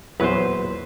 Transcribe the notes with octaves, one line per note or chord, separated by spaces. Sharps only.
E2 A#2 F#3 B4 C5